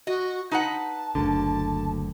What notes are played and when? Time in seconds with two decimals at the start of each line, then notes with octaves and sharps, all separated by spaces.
0.07 F#4 D#5
0.51 D#4 B4 F#5 A5
1.15 F#1 D2 D3